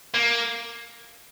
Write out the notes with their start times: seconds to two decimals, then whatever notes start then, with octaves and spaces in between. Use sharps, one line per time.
0.14 A#3